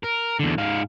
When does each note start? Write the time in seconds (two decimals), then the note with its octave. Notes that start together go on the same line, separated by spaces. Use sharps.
0.04 A#4
0.39 E2 D3
0.58 G#2 F5